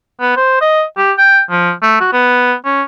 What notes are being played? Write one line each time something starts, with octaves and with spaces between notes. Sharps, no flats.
B3
C5
D#5
G4
G5
F3
A3
F#4
B3
C#4